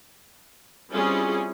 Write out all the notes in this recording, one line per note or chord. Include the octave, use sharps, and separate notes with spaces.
G3 C4 C#4 E4 F4 G#4